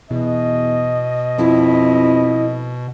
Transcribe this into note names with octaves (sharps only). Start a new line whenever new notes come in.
E2 B2 D#5
F2 E4